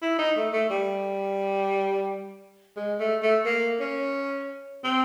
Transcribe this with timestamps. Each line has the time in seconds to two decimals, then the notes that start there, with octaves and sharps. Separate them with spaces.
0.02 E4
0.19 D#4
0.36 A3
0.53 A3
0.70 G3
2.77 G#3
3.00 A3
3.23 A3
3.45 A#3
3.80 C#4
4.84 C4